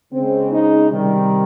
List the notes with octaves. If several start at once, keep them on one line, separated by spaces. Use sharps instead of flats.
C#3 G#3 C4
D#4
C3 D#3 G3